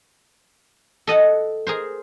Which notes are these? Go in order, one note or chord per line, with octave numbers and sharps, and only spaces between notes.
A4 D#5 F#5 A5
G#4 A#4 C5